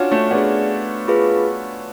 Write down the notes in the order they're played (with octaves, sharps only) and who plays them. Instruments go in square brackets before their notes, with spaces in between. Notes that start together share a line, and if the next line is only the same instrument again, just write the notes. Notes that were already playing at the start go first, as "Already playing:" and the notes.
Already playing: [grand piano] C#4 D4 F4 F#4
A3 C#4
[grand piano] B3 D4 [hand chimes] G#4 B4 D5
[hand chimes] F4 G#4 B4 F5